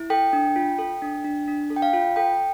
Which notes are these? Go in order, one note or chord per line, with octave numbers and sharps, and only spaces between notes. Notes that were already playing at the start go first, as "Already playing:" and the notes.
Already playing: E4
A4 G5
D4
F4
A4
D4
D4
D4
A4
G5
F5
F4
A4 G5